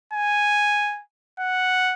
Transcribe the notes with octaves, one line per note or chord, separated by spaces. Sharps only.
G#5
F#5